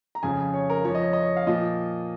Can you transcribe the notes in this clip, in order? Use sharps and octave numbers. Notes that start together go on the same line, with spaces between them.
A#5
F2 C#3 F3 G#5
C#5
A#4
F2 F3 C#5
D#5
C#5
D#5
C#5
F5
A#2 F3 D#5